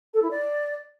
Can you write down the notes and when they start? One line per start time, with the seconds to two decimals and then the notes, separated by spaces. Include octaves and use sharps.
0.14 A4
0.22 E4
0.31 D5